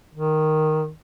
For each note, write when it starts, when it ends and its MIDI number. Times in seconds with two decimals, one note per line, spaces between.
0.14 0.90 51